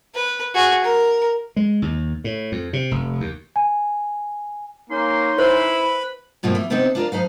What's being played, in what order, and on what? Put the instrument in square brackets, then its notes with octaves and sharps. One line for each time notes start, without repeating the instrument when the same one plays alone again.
[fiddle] B4
F#4 G#4
A#4
[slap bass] G#3
D#2
A2
F2
C3
F1
D#2
[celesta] G#5
[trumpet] A#3 [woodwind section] C#4 D#4 C6
[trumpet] E4 [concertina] B4 B5 [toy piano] C5
[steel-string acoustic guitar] G2 B2 F3 A3 A#3
E3
C3 B3 C4 D4 D#4
D4 F4 A#4 D5
F3 D#4 B4 F5